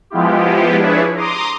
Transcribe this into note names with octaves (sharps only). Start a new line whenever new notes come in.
F3 G#3 B3 E4 F4 G4
F3 D4 E4 G#4 B4 C#5
A#5 C6 D6 D#6